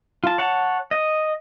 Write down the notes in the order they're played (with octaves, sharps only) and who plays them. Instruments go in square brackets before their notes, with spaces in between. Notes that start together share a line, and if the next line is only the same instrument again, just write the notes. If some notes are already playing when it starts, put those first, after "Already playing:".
[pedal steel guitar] F4 A5
C#5 F#5 A5
D#5